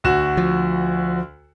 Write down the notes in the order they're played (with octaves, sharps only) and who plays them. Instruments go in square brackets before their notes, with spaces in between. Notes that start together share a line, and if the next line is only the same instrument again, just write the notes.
[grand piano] D2 F#4 E7
[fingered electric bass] F3